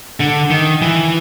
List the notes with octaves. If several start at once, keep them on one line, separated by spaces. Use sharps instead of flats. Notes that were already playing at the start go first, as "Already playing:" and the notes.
D3
D#3
E3